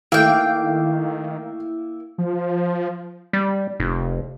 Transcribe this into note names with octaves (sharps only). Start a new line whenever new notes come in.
D#3 A3 A#3 E4 F5 G5
F3
G3
F1